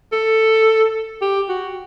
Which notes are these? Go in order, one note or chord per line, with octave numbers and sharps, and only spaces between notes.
A4
G4
F#4